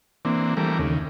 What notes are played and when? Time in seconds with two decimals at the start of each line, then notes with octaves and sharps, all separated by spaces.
0.25 E3 A#3 C4 D4
0.57 E3 G3 A3 A#4 D6
0.78 D#2 C#3